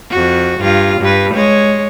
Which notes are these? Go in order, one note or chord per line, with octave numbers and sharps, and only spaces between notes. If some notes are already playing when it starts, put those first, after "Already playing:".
F2 F#4
G2 F4
G2 B4
G#3 C#5